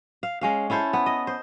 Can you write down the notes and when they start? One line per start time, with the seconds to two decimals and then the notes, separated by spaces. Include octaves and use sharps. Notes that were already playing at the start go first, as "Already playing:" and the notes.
0.23 F5
0.41 G#3 C#4 F5
0.70 C#4 E4 A4 C5
0.93 B3
1.06 D#5
1.27 C5